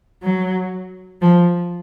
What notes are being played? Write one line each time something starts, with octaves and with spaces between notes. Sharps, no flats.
F#3
F3